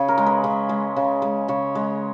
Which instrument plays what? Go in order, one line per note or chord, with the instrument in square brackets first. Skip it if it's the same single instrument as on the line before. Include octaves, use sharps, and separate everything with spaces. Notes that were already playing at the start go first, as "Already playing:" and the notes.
Already playing: [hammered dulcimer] C#3 G#4
A#4
G#3
B4
C#3
G#3
C#3
G#3
C#3 C#5
G#3